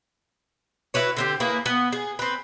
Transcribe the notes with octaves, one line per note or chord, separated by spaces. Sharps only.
E4 F#4 B4 C#5
D3 C4 G4
A#3 E4 G#4 B4
B3
G#4
C4 B4